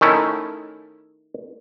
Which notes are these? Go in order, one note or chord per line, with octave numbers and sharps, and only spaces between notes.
D#3 A3 C#4 E4